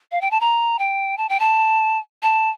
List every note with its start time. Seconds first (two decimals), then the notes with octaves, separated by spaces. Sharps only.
0.12 F5
0.21 G5
0.31 A5
0.41 A#5
0.79 G5
1.18 A5
1.29 G5
1.40 A5
2.22 A5